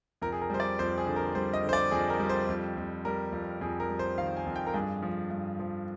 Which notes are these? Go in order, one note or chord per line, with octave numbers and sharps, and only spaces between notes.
F2 A#4
G#4
A#4
G3 C5
D5
F2 C5
G#4
D3
A#4
G3 C5
D#5
D3
C5
D5
F2 G#4
A#4
G3
C5
F2
F2
G3 A#4
F2
F2 G#4
A#4
G3
C5
D#3 F5
G#5
F2
G5
A#4
G2 G#4
F3
G2
F3